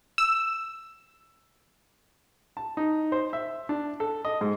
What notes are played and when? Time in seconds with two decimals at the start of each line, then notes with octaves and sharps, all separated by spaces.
0.18 E6
2.57 A5
2.77 D#4
3.12 C5
3.33 E5
3.69 D4
4.00 A4
4.25 D#5
4.41 G#2